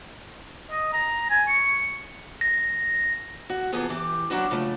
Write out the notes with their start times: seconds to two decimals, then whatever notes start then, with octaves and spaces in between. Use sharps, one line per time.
0.70 D#5
0.93 A#5
1.30 G#5
1.48 C#6
2.41 A#6
3.50 F#4
3.72 C3 E3 F3 B3 G#4 A4
3.89 E3 G4
4.30 F#3 G#3 C#4 D4 E4 F#4
4.51 C#3 F3 A3